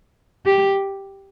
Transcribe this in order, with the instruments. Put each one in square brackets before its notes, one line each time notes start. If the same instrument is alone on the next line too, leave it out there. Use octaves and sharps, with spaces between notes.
[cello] G4